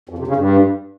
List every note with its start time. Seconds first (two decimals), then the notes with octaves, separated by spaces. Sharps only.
0.09 F2
0.18 C3
0.27 C#3
0.36 G2